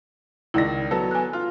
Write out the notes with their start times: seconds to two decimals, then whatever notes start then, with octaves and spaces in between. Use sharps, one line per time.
0.54 C#2 D#3 E4 D5 D#5 A#6
0.91 F#3 B3 A4
1.11 G#5 F#6
1.33 F4